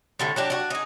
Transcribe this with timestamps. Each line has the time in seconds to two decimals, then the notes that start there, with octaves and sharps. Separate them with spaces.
0.19 A2 D3 G3
0.36 F#3 D4 G4
0.50 D4 F#4
0.70 D#4 G#4